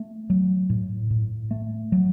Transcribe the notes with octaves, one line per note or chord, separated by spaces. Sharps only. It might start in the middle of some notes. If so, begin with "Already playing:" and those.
Already playing: A3
F#3
A2
A2
A3
F#3